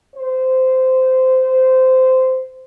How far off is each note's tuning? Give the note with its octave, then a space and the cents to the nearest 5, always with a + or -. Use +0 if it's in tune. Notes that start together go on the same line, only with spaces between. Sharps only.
C5 -15